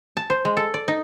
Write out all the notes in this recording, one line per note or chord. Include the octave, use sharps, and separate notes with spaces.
A5
C5
G#3
A4
D5
D#4